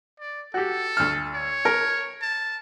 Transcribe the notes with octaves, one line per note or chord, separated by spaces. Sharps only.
D5
F#4 G4 A4
D2 F6
C#5
A#4
A5